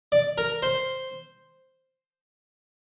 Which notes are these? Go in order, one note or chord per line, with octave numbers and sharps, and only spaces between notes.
D5
A#4
C5